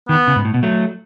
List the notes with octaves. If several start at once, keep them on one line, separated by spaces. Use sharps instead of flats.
D#3 B3
C#3
G#2
A2
B2
F#3 A3